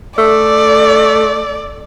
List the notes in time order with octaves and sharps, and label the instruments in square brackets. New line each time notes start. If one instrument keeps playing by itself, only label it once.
[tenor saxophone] A3 [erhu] D5